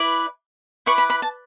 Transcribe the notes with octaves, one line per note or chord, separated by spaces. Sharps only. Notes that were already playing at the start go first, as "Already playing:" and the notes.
Already playing: E4 B4 D5
E4 B4 D5 C#6
B5
B5
A5